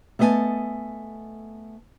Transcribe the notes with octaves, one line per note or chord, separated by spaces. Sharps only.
A3 B3 D#5 E5 G#5 A5